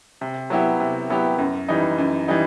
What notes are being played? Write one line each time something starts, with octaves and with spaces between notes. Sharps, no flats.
C3
F#3 B3 E4 G4
C3
F#3 B3 E4 G4
F#2
E3 G3 D#4
F#2
E3 G3 D#4